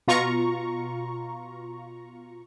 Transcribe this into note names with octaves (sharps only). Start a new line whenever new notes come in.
B2 F4 A#5 C#6